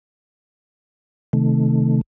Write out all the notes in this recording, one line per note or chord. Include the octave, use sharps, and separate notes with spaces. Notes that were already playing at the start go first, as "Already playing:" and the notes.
C3 D#3 A3